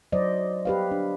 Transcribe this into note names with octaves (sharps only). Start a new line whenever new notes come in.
F#3 C5 D5 D#5
G4 B4 F5
D4